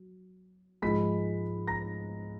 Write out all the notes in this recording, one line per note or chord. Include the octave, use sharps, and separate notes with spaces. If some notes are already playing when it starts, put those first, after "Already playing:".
Already playing: F#3
G#2 F3 G#3 B5 B6
A#5 A#6